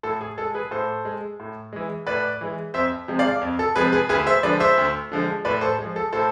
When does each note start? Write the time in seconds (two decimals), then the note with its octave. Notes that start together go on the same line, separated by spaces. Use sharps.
0.03 A2 A4
0.21 G#4
0.38 G#3 A4
0.54 G#4 B4
0.71 A2 A4 C5
1.05 G#3
1.40 A2
1.73 E3 G#3
2.07 A2 B4 D5
2.41 E3 G#3
2.74 F2 C5 E5
3.08 C3 F3 G#3
3.19 D5 F5
3.41 F2
3.59 A4
3.76 C3 F3 G#3 G#4 B4
3.92 G#4 B4
4.09 D2 G#4 B4
4.26 C5 E5
4.43 D3 F3 G#3 B4 D5
4.60 C5 E5
4.78 D2
5.12 D3 F3 G#3
5.45 A2 B4 D5
5.61 A4 C5
5.79 F3 G#3
5.96 A4
6.13 A2 A4 C5